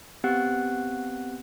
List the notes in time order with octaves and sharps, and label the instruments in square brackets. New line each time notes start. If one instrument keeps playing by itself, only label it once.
[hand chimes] B3 C4 G4 F#5 F#6